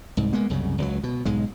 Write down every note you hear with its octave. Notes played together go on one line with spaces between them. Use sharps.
C2 G#2
G#3 A#3 B3
C2 F#2 C#3
C#2 F3 F#3
B2
B1 G#2 G#3